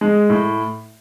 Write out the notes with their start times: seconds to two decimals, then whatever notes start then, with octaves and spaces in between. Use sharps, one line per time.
0.01 G#3
0.30 A2